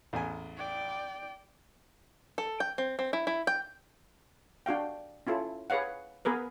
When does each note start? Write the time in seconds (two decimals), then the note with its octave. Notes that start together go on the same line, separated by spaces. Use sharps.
0.13 A1 E2 G#5
0.58 D5 G5
2.38 A4
2.60 G5
2.78 C4
2.99 C4
3.13 E4
3.27 E4
3.47 G5
4.66 D4 F#4 F5 G5
5.27 C#4 E4 F4 A4
5.70 G#4 B4 C#5 F5 F#5
6.25 B3 G#4 A#4 B4